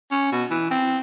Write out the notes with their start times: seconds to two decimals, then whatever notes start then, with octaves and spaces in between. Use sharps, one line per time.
0.11 C#4
0.32 B2
0.50 E3
0.71 C4